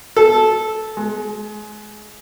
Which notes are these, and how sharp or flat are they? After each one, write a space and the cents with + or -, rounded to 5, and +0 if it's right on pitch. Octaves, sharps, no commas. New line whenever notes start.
A4 -10
G#3 +30